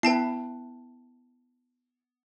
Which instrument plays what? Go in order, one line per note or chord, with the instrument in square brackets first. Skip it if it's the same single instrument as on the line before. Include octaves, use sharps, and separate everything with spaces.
[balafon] B3 [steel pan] E4 B4 [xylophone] G5 A5 C7